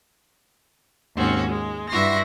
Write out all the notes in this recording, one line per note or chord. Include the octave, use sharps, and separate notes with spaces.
D#2 G#2 C4 C#4 F#4
G#3
G2 E4 F#4 E5 C6 A#6